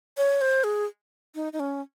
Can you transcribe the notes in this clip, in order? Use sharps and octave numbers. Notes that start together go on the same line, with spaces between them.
C#5
C5
G#4
D#4
D#4
C#4